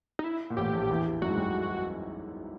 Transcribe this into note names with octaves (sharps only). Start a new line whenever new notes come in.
D#4
E4
A#2
A1 A2 G4
A#1 A#2
E2 E3
F#2 F#3 F#4
G#2 G#3
G3